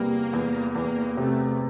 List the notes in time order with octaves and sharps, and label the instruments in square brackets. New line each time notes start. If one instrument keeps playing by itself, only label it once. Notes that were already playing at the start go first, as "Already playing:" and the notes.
Already playing: [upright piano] E2 C3 G3 [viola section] A#3
[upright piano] E2
[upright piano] E2 [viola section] A#3
[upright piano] C3 [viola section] A3